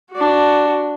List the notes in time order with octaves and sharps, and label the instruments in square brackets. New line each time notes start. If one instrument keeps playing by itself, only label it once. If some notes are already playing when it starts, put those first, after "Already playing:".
[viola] D4 F#4